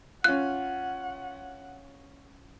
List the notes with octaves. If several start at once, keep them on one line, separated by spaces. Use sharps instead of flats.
C#4 F4 F#5 F#6